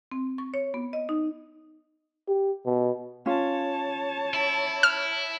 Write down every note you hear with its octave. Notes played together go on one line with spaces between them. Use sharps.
C4
C#6
C#5
B3
D#5
D#4
G4
B2
C#4 F4 C#5 A5
E4
F6